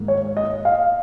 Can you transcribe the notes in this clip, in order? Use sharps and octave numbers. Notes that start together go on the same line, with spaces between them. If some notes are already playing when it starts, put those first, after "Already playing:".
Already playing: G#2 D#3 A#3
C#5
D#5
F5